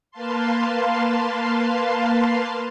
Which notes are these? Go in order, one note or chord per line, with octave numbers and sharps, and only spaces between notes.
A#3 B4 F5 A5 C6